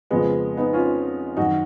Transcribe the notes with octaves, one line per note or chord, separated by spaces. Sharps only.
F2 C#3 G#3 B3
B3 D#4
C#4 F4
F#2 D#3 D#4 F#4